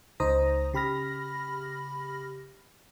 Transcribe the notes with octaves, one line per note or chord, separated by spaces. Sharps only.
C#2 D#4 C5 A#5 D#6 A#6
C#3 G4 B5 F6 A#6